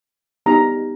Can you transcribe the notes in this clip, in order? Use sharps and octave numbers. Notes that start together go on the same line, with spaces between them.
G3 B3 D#4 G4 A#5